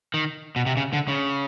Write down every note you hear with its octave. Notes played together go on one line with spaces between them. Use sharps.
D#3
B2
C3
C#3
D3
C#3